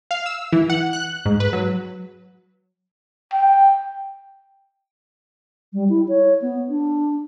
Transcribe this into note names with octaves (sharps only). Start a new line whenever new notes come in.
F5
E6
E3
F#5
F#6
G#2
B4
F#3
G5
G3
E4
C#5
B3
D4